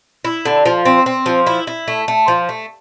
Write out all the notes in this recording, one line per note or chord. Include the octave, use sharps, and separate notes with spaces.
E4
D3
F3
C4
C4
F3
E4
E4
A3
A3
F3
A3